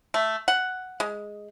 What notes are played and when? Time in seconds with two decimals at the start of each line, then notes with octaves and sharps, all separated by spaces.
0.14 A3
0.48 F#5
1.00 G#3